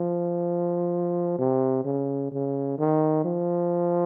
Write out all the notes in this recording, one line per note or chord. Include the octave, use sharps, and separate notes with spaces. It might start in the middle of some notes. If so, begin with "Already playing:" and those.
Already playing: F3
C3
C#3
C#3
D#3
F3